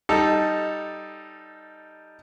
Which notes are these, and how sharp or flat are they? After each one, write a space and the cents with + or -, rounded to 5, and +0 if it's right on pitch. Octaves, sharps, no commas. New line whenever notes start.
G3 +0 D#4 +0 A4 +0